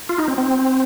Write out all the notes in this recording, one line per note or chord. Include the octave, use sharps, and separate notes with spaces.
F4
D#4
C4
C4